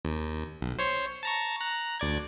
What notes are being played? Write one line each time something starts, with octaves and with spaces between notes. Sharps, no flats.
D#2
B1
C5 C#5 C6
A5 A#5 C#6
A#5 F#6
D2 D5 G#6